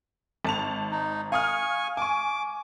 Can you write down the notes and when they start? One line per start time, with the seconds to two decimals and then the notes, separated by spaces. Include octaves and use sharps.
0.45 G#1 A5 F7
0.91 D#4
1.32 F5 G#5 C#6 D#6 F6
1.97 G#5 C#6 D6